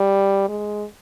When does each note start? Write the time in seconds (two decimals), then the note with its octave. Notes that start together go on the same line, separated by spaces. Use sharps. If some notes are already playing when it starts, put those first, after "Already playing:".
Already playing: G3
0.49 G#3